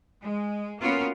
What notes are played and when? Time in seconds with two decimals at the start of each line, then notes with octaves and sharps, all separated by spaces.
0.23 G#3
0.81 A#3 B3 C#4 F4 F#4 A#4